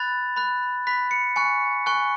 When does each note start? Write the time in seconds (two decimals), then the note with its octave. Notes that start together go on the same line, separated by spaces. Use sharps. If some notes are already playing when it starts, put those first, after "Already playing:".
Already playing: B5 F#6 A6
0.36 B5 F#6
0.87 B5 F#6 B6
1.11 C#7
1.36 G#5 C#6 F#6 C#7
1.86 G#5 C#6 F#6